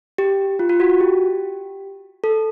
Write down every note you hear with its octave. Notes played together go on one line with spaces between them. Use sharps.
G4
F4
F4
F#4
F#4
G4
A4